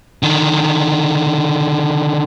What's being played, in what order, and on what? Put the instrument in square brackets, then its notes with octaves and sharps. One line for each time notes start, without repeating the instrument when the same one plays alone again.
[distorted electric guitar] D3 D#3